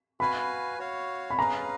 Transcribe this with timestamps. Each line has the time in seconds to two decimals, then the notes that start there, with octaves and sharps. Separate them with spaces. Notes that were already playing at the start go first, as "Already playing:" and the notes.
0.20 F#4 B4 F5 G#5 B5
0.79 F#4 C#5 F5
1.30 B5
1.38 C#4 G#4 B4 F5 A#5